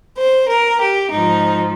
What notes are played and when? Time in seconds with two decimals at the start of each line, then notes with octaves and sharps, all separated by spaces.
0.17 C5
0.49 A#4
0.81 G4
1.12 G#2 F3 D#4